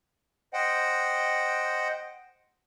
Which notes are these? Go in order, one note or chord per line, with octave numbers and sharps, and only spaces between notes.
C5 D#5 F#5 G5